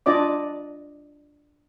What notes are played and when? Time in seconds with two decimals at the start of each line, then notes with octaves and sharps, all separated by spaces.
0.06 D4 F4 D5 D#5 D6